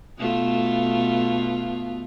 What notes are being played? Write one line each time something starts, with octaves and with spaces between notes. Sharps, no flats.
B2 A3 F4